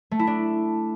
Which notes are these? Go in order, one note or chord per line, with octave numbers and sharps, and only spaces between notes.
A3
E4
D4